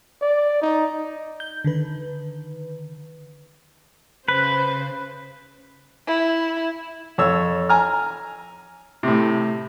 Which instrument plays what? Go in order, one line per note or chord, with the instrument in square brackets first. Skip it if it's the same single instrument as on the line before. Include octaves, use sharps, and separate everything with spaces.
[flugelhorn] D5
D#4
[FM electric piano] G6
D3 D#3 B4
[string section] C#3 C5 [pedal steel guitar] B4
[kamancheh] E4
[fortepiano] F2 C#5 E6
G#5 A#5 F6
A2 C3